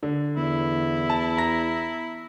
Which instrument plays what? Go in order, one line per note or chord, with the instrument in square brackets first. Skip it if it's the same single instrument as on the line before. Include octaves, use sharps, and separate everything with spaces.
[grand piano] D3
[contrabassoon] E2 [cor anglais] E4
[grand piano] A5
A#5 A#6